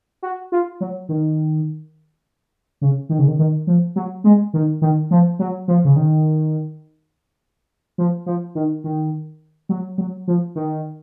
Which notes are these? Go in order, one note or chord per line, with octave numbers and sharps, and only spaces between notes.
F#4
F4
F#3
D#3
C#3
D#3
C#3
D#3
D#3
F3
F#3
G#3
D#3
D#3
F3
F#3
F3
C#3
D#3
F3
F3
D#3
D#3
F#3
F#3
F3
D#3